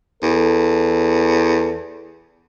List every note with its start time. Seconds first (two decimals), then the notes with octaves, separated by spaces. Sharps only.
0.23 E2 A4